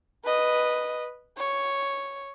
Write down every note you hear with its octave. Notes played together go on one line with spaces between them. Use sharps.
B4 D#5
C#5